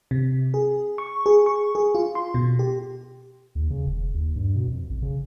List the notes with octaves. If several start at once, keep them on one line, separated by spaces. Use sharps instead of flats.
C3
G#4
C#6
G#4
C#6
G#4
F4
C6
B2
G4
D#2
C#3
E1
D#2
G2
B2
F2
A1
C#3